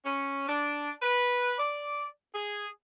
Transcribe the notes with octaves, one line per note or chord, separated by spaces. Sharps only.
C#4
D4
B4
D5
G#4